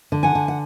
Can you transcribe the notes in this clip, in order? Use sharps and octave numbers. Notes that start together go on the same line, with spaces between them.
D3
F#5 G#5
D3
F#5